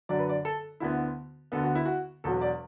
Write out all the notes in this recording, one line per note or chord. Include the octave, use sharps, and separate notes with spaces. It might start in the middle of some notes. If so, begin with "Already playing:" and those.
F#2 D3 F#3 D5
B4
D5
A4
D2 D3 B3 E4
D2 D3 B3 A4
F#4
E4
F#4
E1 E2 B2 F#3 A4
D5